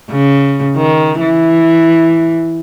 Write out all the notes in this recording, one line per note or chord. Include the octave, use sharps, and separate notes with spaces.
C#3
D#3
E3